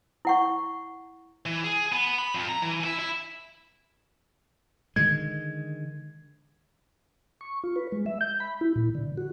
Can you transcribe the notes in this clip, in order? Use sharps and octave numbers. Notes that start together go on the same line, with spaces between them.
E4 F#5 C#6
E3
G#4
B3
B5
F2
A#5
E3
E4
E4
D3 D#3 G#3 G#6
C#6
F4
B4
G#3
E5
G6
B5
E4
A#2
D3
F#4